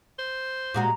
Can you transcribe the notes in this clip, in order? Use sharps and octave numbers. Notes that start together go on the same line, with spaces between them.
C5
A#2 G#3 F#4 A#5